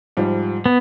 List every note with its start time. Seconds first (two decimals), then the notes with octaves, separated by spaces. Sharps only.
0.17 G#2 F3 G3
0.66 B3